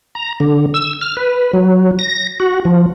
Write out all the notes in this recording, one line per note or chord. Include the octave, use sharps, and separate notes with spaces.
A#5
D3
E6
F6
B4
F#3
A#6
F#4
F3